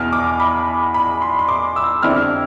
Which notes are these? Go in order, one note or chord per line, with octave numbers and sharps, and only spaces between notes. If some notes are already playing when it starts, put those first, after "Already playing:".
Already playing: E2 B2 B3 F6
D6
B5
B5
C6
C6
D6
E6
F2 D3 G3 C4 E4 F6